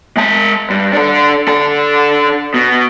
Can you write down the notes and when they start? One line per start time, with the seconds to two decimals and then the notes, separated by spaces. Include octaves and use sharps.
0.17 G#3 A5
0.70 G2
0.93 D4 A4
1.48 D4 A4
2.54 B2